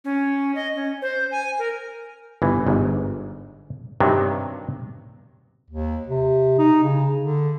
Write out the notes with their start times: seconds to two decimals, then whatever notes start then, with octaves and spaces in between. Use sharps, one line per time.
0.04 C#4
0.55 D#5
0.75 C#4
1.02 C5
1.31 G#5
1.59 A#4
2.42 G1 E3
2.66 G1 G#2
4.00 G2 C3 D#3 F#3
5.70 D#2
6.09 C3
6.59 D#4
6.84 C#3
7.21 D3